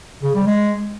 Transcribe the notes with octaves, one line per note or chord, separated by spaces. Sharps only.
C#3
G3
G#3